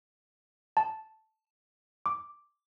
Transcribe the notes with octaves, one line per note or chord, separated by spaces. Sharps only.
A5
D6